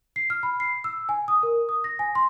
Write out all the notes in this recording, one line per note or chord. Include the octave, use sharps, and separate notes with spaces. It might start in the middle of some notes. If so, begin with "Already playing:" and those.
C7
F6
B5
C7
E6
G#5
D#6
A#4
D#6
A#6
G#5
C6